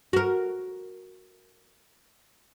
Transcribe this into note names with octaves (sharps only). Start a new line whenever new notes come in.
F#4 A#4